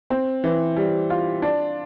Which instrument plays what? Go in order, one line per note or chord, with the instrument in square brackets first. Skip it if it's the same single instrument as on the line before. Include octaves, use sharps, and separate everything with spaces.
[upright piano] C4
E3
G3
F4
D4